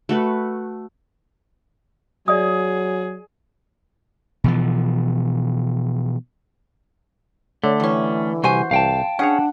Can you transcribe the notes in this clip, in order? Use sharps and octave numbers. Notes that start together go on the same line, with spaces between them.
A3 F#4 B4
F#3 G#4 D5 E5 D#6
B2 E3 F3
D3 A3 C#5
E3 G3 C#4
C2 F#4 G4 C5 G#5
C2 F5 G5 A5
C#4 D4 G#4 C#5 F#5